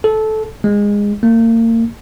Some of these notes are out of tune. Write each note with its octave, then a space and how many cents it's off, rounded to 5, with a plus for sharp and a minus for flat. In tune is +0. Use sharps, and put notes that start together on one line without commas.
A4 -15
G#3 -20
A#3 -35